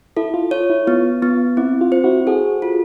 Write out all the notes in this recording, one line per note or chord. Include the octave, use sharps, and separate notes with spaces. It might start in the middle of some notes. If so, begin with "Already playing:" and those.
E4 A4
F4
F4 C#5
E4
B3 F4
B3 F4
C4 E4
F4
C5
E4 F#4
F#4 G#4 A4
F4